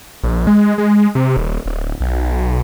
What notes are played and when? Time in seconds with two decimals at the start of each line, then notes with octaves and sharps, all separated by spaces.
0.23 A#1
0.47 G#3
0.78 G#3
1.15 C3
1.37 D#1
1.66 D1
2.01 B1
2.38 B1